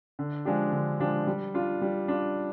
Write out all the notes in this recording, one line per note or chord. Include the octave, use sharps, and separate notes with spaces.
D3
F3 G#3 D4 G4
D3
F3 G#3 D4 G4
G3
D4 F4
G3
D4 F4